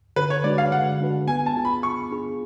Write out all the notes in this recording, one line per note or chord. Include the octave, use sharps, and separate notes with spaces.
D3 B4
C#5
G#3 D4 F#4 B4 D5
F5
D3 F#5
G#3 D4 F#4 B4
B3 G#5
A5
D4 F4 G#4
B5
B3 C#6
D4 F4 G#4